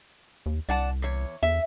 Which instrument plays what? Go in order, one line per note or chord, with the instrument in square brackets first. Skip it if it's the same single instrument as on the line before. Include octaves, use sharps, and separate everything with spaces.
[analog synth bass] D#2
[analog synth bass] C2 [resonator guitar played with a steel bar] D5 F#5 A5
[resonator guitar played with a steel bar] E2 C#5
[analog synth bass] E2 [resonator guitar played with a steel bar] E5